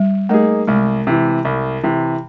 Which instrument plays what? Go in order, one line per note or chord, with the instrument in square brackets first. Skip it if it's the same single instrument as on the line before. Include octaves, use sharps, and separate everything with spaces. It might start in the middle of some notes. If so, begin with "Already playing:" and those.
Already playing: [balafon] G3
[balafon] A3 [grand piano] A#3 D#4 G#4
[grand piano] C2 [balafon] G#3
[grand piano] C3 E3
C2
C3 E3